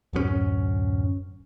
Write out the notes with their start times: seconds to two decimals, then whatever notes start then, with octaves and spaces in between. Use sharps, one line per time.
0.13 D1 F#2 G3 C#4